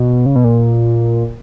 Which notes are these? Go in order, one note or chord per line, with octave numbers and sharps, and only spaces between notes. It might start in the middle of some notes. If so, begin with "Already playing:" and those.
Already playing: B2
C#3
B2
A#2